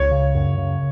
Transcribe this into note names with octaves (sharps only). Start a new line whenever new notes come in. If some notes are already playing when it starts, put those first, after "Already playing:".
Already playing: C#2 C#5
C#3
F#2
C#3